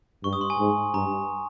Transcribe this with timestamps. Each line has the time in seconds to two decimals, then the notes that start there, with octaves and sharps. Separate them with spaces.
0.24 G2 C#6
0.33 D#6
0.41 C6
0.50 G#5
0.59 G#2
0.94 G2 A#5